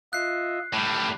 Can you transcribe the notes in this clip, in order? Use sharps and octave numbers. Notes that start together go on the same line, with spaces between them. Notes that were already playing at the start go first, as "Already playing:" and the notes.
F4 D#5 E5 F#6 C7
A2 G3 B5 D6